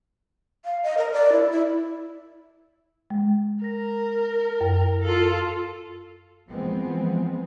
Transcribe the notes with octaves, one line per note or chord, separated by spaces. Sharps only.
F5
D#5
A#4
D5
E4
E4
G#3
A#4 A#6
F#2
F4 A4
E3 F3 G#3 B3 C4